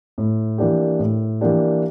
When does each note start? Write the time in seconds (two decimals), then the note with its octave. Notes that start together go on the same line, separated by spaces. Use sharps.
0.18 A2
0.58 E3 A#3 D4 G4
0.99 A2
1.41 E3 A#3 D4 G4